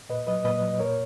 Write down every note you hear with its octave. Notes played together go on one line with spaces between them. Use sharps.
A#2 B4 D#5
F#3 B4 D#5
A#2 B4 D#5
F#3
D#5
A#2 A#4 C#5